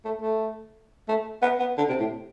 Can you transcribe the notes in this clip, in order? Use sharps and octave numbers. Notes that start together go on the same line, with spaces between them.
A3
A3
A3
B3
B3
D3
C3
A2